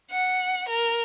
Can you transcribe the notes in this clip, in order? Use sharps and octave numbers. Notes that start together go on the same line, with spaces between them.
F#5
A#4